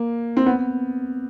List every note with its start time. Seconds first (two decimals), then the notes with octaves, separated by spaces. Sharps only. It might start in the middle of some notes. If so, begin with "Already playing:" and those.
Already playing: A#3
0.37 C4
0.46 B3